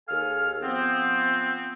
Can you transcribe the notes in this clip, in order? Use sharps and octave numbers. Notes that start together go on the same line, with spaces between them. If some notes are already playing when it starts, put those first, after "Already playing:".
D#2 G#4 A4 F5 G#5 F6
F3 B3 C4